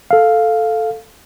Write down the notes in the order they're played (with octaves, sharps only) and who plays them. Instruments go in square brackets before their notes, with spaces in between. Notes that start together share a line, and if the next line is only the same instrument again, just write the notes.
[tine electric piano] A4 F5